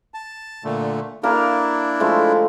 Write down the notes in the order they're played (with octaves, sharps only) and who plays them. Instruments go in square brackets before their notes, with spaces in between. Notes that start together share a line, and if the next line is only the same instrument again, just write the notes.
[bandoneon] A5
A#2 D3 A3
[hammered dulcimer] A#3 A#4 F5 [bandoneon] D4 E4
[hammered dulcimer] F3 G#3 A3